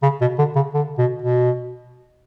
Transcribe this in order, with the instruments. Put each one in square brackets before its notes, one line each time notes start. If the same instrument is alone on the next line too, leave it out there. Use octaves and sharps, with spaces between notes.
[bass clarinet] C#3
B2
D3
C#3
D3
B2
B2